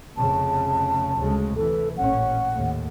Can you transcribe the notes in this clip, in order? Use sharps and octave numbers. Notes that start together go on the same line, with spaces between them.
F1 C#3 A5
D2 C#3 G#3
C3 E3 A4
A1 A#2 C#4 F#5
D#2 A2